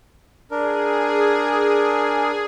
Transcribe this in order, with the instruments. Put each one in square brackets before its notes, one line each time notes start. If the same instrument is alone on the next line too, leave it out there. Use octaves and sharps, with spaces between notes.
[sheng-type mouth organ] D4 A#4 [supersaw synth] G#4